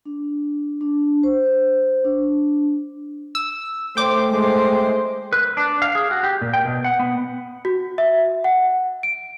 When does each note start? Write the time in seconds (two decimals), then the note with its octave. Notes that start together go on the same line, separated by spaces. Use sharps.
0.05 D4
0.81 D4
1.23 C5
2.05 D4
3.35 E6
3.97 A3 C5 G5 D6
4.30 G#3 C5
5.33 B4
5.57 D4
5.82 F5
5.95 G#4
6.11 F#4
6.23 G4
6.41 A#2
6.54 G5
6.65 B2
6.84 F#5
6.99 B3
7.65 F#4
7.98 E5
8.44 F#5
9.03 D7